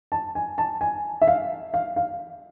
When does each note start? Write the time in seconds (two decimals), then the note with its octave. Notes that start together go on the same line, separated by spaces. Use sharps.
0.12 A5
0.35 G#5
0.58 A5
0.81 G#5
1.21 E5
1.28 F5
1.74 F5
1.96 F5